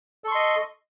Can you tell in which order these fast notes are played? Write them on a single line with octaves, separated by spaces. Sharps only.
A4 C#6 C6 D#5